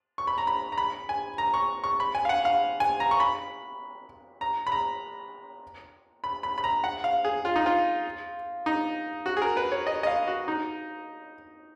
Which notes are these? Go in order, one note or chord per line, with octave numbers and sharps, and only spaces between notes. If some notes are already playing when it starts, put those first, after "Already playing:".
C#6
B5
A#5
B5
A#5
B5
G#5
A#5
C#6
C#6
B5
G#5
F5
F#5
F5
G#5
A#5
C#6
B5
A#5
B5
A#5
B5
B5
B5
A#5
F#5
F5
G#4
F4
D#4
F4
D#4
F#4
G#4
A#4
B4
C#5
D#5
D#5
F5
F#4
D#4